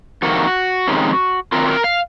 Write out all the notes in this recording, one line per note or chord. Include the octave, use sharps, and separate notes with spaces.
F2 C3 D#3 A#3 F#4
F2 C3 D#3 G#3 C#4
D#3 F#3 C4 F4 A#4
A#4
F5